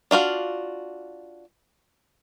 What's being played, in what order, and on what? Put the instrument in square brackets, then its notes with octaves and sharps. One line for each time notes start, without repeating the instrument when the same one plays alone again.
[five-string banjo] D4 F4 F#4 F5